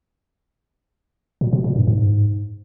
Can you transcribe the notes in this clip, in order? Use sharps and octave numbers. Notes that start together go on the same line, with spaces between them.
A#2
B2
A#2
G2
G#2